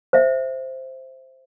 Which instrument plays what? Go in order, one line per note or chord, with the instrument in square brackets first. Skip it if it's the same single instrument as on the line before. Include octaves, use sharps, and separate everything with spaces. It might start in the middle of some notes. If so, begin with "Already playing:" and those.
[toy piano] C5 E5